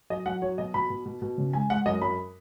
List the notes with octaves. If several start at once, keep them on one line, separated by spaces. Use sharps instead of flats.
F#3 D#5
F#3 F#5
F#3 C#5
B2 D#5
B2 B5
B2
B2
B2
C#3
G#3 G#5
G#3 F#5
F#2 D#5
F#2 B5